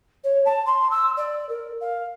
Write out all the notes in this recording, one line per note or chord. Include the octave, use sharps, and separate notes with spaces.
C#5
A5
C6
E6
D5
A#4
F5